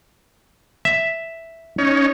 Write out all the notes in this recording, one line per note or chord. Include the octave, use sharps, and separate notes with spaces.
E5
C#4 D#4 C#5